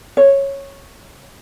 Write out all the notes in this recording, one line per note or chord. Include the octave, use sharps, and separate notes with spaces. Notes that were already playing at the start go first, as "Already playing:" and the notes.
C#5